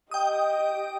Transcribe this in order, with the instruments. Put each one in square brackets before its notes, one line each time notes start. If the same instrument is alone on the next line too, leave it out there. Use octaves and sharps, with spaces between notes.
[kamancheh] G4 D#5 [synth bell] G5 D#6